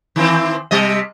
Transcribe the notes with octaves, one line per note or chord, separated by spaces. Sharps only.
D#3 E3 C4
C3 G3 D#5